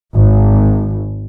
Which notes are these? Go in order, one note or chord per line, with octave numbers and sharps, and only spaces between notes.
G#1